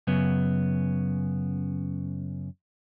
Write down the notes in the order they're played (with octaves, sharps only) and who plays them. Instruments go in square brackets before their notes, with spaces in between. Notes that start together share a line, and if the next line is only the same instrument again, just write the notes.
[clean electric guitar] F#2 C#3 B3